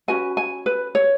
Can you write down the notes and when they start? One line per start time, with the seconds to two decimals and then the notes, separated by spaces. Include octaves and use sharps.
0.08 C#4 F#4 B4 G#5
0.37 G#5
0.66 B4
0.95 C#5